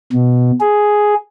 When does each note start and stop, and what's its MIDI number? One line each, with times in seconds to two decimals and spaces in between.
0.13 0.52 47
0.60 1.15 68